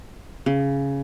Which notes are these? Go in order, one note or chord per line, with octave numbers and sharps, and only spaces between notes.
C#3